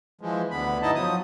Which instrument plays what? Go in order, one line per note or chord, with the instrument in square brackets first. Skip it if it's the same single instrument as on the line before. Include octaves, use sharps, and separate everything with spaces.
[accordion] E3 F3 G#3
D2 D3 B3 B5
G2 B3 D#4 E4 D#5 A5
F3 F#3 D#6